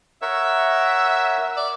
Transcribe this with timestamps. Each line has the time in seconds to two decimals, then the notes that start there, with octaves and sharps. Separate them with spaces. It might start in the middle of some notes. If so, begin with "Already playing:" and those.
0.22 A#4 C#5 E5 F#5
1.57 D5